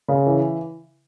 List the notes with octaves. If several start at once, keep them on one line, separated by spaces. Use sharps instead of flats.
C#3
E3